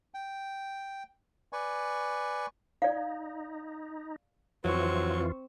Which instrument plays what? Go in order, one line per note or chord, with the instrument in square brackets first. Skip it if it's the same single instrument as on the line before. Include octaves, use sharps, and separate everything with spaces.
[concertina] G5
B4 D5 G#5 C#6
[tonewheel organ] D#4 [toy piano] D5 F5
[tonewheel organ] F2 E3 F4 [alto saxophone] F#3 [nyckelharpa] C4 C#6